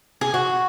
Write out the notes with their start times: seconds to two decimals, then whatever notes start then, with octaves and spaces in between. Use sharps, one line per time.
0.21 G#4
0.34 F#4